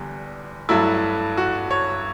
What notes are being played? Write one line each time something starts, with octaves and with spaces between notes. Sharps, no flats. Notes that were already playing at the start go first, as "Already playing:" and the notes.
Already playing: E2 D3 G3
G2 F#3 A3 E4
F#4
C#5